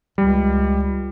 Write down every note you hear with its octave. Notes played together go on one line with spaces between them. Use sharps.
C#2 G3